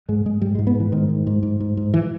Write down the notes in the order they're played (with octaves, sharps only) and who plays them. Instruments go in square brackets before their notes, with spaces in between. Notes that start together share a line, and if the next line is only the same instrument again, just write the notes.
[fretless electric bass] G#2 G#3
G#2 G#3
G#2 G3
G#3
G#2
B3
G#2
E3
G#2 D#3
G#2
G#2
G#2
G#2
G#2
E3